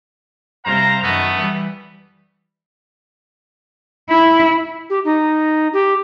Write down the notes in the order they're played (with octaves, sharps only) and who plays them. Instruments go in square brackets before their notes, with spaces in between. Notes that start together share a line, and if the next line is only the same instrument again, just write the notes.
[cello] C3 G3 [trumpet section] C5 F5 A#5
[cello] F#2 D#3 [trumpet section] A3 B3
[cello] E3 G3
E4
[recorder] G4
D#4
G4